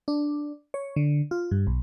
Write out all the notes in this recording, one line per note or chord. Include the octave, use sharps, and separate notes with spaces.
D4
C#5
D3
F4
G2
B1